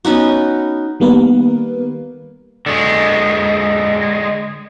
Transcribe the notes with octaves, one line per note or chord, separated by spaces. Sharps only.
B3 C#4 D#4 F#4
D#3 G3 A#3 B3 A#4 B4
D3 G#3